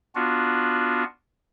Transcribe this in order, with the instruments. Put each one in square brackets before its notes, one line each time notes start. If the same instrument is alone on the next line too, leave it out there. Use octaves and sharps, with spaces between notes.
[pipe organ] B3 D4 F4 F#4